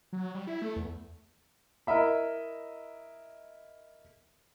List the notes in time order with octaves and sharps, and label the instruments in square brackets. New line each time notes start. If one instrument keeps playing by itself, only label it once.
[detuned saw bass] F#3
G3
E4
A3
E2
[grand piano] E4 A#4 D#5 E5 B5